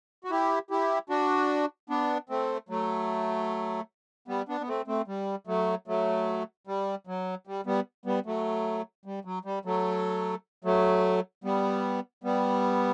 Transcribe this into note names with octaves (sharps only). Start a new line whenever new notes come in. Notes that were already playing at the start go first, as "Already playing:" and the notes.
F#4
E4 G4
E4 G4
D4 F#4
B3 D4
A3 C4
F#3 A3
G3 B3
B3 D4
B3
A3 C4
A3 C4
G3
F#3 A3
F#3 A3
G3
F#3
G3
G3 B3
G3 B3
F#3 A3
G3
F#3
G3
F#3 A3
F#3 A3
G3 B3
G3 B3